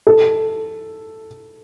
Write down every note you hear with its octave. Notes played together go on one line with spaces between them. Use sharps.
A4